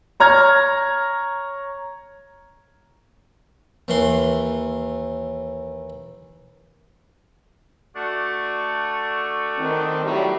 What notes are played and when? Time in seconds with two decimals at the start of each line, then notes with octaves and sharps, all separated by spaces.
0.20 C#5 A#5 F6 G#6
3.88 D#2 E3 C6
7.96 A3 D4 F#4
9.58 D#3 C4
10.04 A2 F#3 G3